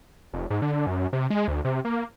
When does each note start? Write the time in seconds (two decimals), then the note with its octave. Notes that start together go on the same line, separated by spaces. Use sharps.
0.33 F1
0.50 G#2
0.62 D3
0.87 F#2
1.13 C3
1.30 G#3
1.48 D2
1.65 C3
1.85 A#3